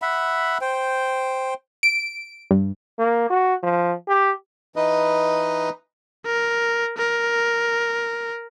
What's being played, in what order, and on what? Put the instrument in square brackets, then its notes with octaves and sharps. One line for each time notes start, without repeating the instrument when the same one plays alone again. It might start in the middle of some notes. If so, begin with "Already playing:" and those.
[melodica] E5 F#5 B5
C5 G5
[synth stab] D7
G2
[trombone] A#3
F#4
F3
G4
[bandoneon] E3 D#4 B4 D#5
[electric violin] A#4
A#4